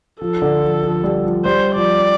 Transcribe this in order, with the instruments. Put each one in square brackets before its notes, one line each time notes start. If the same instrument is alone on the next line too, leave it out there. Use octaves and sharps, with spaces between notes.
[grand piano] F3 [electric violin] A4
[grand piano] D3
F3
F3
G3
F3
[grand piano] G3 [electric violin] C5
[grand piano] F3 [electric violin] D5